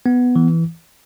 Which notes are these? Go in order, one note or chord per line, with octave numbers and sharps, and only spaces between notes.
B3
E3